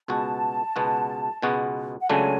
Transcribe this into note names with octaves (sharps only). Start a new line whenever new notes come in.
C#2 B2 G#3 B3 F#4 A5
C#2 B2 G#3 B3 F#4
C#2 B2 G#3 B3 F#4
F#5
C#2 C#3 F#3 A3 D4 G#5